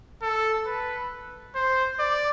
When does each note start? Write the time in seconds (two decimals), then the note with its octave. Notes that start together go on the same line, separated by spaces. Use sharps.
0.22 A4
0.66 B4
1.55 C5
1.99 D5